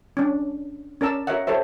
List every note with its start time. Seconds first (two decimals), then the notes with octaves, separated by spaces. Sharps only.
0.17 C#4 D4
1.01 C#4 A#4 D5 A5 E6
1.27 F#4 A#4 C#5 D#5 E5 F#5
1.47 G4 A4 C5 C#5 E5